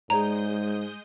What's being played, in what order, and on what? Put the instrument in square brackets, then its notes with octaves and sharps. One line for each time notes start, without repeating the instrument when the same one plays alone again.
[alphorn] G#2 [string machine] G#3 D#6 G6 [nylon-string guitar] G#4 C#5 D5 [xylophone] A#5